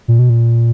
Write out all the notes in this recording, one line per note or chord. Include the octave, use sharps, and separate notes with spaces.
A#2
B2
A#2